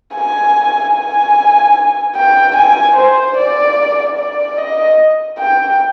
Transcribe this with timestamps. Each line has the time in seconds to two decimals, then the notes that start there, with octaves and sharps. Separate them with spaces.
0.14 G#5
0.94 G#5
2.16 G5
2.56 G#5
2.97 C5
3.37 D5
4.18 D5
4.58 D#5
5.39 G5